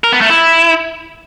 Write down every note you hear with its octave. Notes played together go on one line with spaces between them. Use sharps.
A#4
B3
A3
E4